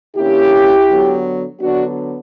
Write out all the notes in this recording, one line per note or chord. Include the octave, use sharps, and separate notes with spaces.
D3 A#3 C#4 E4 G4
D3 F#3 B3
D3 F#3 B3 D4 F#4